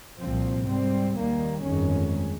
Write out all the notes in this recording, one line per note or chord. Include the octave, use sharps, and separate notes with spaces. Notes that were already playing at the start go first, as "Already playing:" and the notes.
C2 A#2 F3 C4
G#2 G3 C4
D#2 D#3 G3 A#3
G1 F2 D#3 G#3 C#4